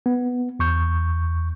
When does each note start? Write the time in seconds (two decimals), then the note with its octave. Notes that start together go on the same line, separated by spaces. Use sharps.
0.06 B3
0.59 E2 C#6 G6